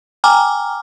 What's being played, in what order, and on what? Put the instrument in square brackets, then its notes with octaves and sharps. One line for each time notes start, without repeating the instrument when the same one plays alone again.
[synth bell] G5 G#5 A#5 D6 F6